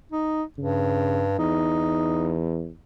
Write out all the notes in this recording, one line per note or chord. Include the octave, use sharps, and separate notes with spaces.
D#4
G2 C#3
E2 D#4